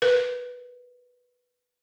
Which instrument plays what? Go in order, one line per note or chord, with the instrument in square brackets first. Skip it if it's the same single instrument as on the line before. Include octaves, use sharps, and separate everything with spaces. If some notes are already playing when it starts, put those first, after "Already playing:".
[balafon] A#4 B4